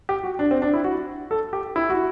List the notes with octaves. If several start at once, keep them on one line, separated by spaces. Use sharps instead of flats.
G4
F#4
D4
C4
D4
E4
F#4
A4
G4
E4
F#4